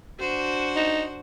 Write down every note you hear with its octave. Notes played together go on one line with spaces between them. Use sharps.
D4 F#4 C5
D#4